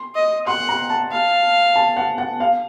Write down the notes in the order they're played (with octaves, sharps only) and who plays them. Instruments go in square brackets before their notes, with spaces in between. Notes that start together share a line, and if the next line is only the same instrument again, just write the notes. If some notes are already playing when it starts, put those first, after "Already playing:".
Already playing: [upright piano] C6
[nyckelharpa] D#5
[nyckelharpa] F#5 [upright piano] C6
[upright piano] A#5
A5
[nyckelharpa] F5
[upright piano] A5
F#5
F#5
F5